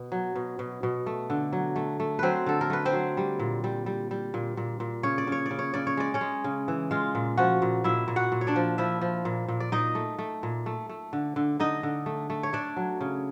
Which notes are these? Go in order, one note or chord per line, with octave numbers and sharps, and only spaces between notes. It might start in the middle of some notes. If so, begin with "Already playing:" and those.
Already playing: B2
F#3
B2
B2
B2
A3
D3
F#3
A3
A3
F#3 C4 B4 C5
D3 A4
A#4
A3 B4
C4 C5
F#3
G3
A#2
G3
G3
G3
A#2
A#2
A#2
C#3 C#5
D5
C#3 C#5
D5
C#3
C#5
C#3 D5
C#5
G#3 D5
C#4 C#5
G#3
C#3
E3
G#3 F4 F5
A#2
F3 F#4 F#5
A#2
A#2 E4 E5
A#2
F#4 F#5
A#2
C#5
D4 D5
F3
F3 E4 E5
F3
A#2
A#2
D5
A#2 D#4 D#5
A3
A3
A#2
A3
A3
D3
D3
D3 D#4 D#5
D3
A3
A3
C#5
A3 D4 D5
F#3
C#3